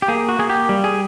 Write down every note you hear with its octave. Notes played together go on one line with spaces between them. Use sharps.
G4
A#3 G#4
F#4
A#3 G#4
G4
G3
G#4